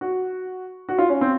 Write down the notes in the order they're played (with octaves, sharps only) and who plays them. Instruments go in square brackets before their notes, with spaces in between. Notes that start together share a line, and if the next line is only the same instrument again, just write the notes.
[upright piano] F#4
F#4
F4
C#4
C4